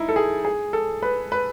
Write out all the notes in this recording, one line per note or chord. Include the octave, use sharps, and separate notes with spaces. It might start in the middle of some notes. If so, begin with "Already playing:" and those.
Already playing: D#4 E4
A4
G#4
G#4
A4
B4
B4